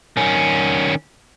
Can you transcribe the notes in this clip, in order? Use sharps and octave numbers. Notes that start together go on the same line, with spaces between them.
D#3 C#4